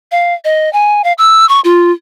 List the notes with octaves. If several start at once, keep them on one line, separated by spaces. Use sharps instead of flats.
F5
D#5
G#5
F5
E6
C#6
F4